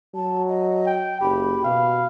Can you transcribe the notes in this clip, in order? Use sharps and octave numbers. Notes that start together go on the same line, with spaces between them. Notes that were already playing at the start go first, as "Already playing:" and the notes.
F#3 A5
D#5
G5
F#1 G4 B5
B2 F5